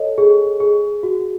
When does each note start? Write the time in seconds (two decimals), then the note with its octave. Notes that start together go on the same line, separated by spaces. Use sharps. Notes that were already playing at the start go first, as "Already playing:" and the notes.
Already playing: A4 C#5 D#5
0.18 G#4
0.60 G#4
1.03 F#4